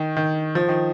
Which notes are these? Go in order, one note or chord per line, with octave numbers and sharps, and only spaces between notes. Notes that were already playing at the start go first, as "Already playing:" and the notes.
Already playing: D#3
D#3
F3
D#3